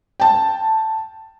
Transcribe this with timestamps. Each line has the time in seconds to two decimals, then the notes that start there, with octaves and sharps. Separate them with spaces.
0.20 G5 A5